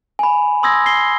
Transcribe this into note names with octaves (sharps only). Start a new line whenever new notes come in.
G#5 B5
C6 D#6 E6 G#6 A#6
C7 G7